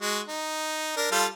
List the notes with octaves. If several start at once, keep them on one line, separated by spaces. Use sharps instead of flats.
G#3 F#4
D#4
D4 A#4
G3 F4 A4